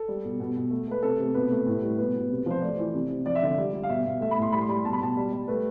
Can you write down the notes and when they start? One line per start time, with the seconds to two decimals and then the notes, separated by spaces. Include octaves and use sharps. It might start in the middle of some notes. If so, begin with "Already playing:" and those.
Already playing: A4
0.08 G3
0.24 B2
0.40 B2
0.56 B2
0.71 A3
0.88 A3 B4
1.03 C3 A4
1.19 C3
1.34 B2 B4
1.50 A3
1.66 A2
1.82 G3
1.98 B2 B4
2.15 B2
2.30 C3
2.46 F3 C5
2.62 A3 D5
2.78 E3
2.94 C3
3.10 C3
3.26 F3 D5
3.35 E5
3.42 D3 D5
3.58 G3
3.74 G3
3.83 F5
3.89 B2 E5
4.05 B2
4.21 A3 E5
4.31 B5
4.37 A2 C6
4.52 G3 B5
4.61 C6
4.68 G3 B5
4.84 B2 A5
4.93 B5
5.00 B2 A5
5.17 G3
5.33 G3
5.48 A3 B4